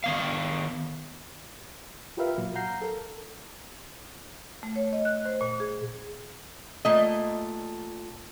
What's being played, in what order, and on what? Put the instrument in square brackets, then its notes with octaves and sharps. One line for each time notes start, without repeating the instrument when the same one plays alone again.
[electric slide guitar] D#3 B3 F5
[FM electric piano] F4 G4 A#4 B4 E5 F5
A#2 F#3
F5 F#5 A#5 G6 C7
A4 A#4
[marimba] A3
C#5
D#5
F#6
C5
A#2
G#4
[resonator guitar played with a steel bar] A#2 A3 D#5